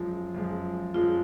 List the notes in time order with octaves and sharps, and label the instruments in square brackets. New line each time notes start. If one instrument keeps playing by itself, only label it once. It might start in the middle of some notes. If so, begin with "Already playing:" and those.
Already playing: [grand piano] F#2 F3 G#3 [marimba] F4
[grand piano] F#2 F3 G#3
[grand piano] F#2 F3 G#3 [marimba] F4